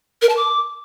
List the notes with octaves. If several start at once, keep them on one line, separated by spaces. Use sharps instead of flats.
A#4
A5
D6